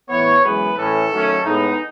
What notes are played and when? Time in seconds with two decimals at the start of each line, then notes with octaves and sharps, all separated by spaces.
0.08 A2 E3 B3 C#5
0.43 F#2 E3 G#3 B3 B4
0.77 A2 E3 A3 C#4 A4
1.11 D#3 F#3 A3 C#4
1.44 A2 G#3 B3 D#4